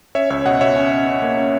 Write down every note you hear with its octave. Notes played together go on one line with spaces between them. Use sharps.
C#4 C#5 E5
C#2 C#5 E5
B2 D#5 F#5
B2 C#5 E5
C#4
C#4
C#4
A#3
C#4